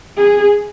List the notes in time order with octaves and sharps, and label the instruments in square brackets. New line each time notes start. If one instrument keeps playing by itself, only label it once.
[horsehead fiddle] G#4